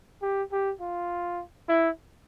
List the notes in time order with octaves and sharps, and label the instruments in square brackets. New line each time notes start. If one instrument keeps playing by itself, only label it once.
[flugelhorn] G4
G4
F4
E4